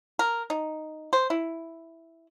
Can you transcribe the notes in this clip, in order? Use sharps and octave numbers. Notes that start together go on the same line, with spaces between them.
A#4
D#4
C5
E4